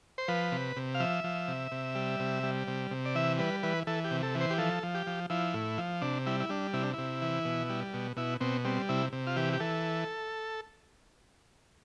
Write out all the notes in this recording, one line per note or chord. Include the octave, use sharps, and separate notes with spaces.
C5
F3 B4
C3
C3
F5
F3 E5
F3
C3
C3
G3
C3
G3
C3
C3
D5
E3 E5
G3 B4
E3 B4
E3 A4
G4
C3
A4
E3
C5
G4
F3 A4
F3
G4
F3
F3 E4
A2
F3
C3 D4
G3 E4
E4
G3 D4
C3 E4
D4
C3 E4
E3
B2
G3
B2
B2 E4
B2 C4
G3 C4
C3 E4
C3
F4
E3 G4
G4
E3 A4